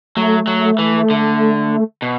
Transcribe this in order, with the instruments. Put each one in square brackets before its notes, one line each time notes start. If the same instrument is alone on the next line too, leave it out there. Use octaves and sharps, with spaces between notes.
[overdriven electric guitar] F#3 [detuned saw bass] A3
[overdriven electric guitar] F#3
E3
D3
B2